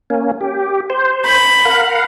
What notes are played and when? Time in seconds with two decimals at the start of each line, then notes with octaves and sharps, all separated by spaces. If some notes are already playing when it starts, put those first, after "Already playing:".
0.10 A#3 C#4
0.41 G4
0.90 C5
1.25 B5
1.65 A#4 F5 F#5